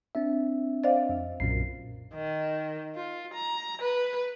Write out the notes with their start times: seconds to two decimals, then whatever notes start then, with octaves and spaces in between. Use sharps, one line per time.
0.15 C4 D4 E5
0.84 C5 D5 D#5 F5
1.09 F2
1.40 B1 F#2 A#2 C7
2.14 D#3
2.95 F4
3.33 A#5
3.81 B4